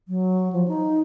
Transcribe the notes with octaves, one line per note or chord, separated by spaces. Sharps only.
F#3
F3
D#4